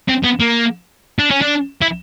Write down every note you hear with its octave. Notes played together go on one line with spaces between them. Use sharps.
C4
B3
A#3
D4
C#4
D4
E4